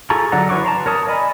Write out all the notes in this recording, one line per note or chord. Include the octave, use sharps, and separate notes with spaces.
F4 G#4 A4 A#5 C#6
D3 F#3 D5 F#5 A#5
E3 B4 C#5 C#6 D6
A5 A#5 C6
A#4 C#5 A5 D#6
D5 D#5 G#5 B5